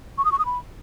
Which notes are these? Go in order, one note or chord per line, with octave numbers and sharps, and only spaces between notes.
C#6
D#6
C#6
D#6
B5